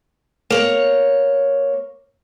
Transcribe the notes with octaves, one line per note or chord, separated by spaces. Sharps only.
A#3 C#5